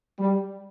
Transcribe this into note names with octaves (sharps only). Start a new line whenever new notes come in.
G3